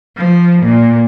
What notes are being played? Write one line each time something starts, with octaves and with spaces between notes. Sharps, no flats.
F3
A#2